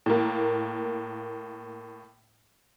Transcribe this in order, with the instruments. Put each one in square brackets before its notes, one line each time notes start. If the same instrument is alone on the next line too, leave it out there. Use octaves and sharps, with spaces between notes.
[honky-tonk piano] A2 A#3